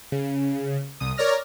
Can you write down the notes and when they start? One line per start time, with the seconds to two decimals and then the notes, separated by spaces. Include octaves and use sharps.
0.12 C#3
1.00 C2 D#6
1.17 A#4 C#5 D5 F6 A#6